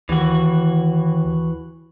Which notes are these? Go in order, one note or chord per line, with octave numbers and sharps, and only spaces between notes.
D#2 E3 F#4